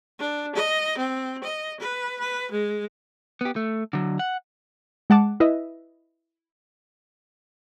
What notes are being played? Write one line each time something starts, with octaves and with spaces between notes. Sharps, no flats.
D4
D#5
C4
D#5
B4
B4
G#3
B3 G4
A3
D3 F#3
F#5
G#3 F#5 A5 D6
E4 B4 D#5 E5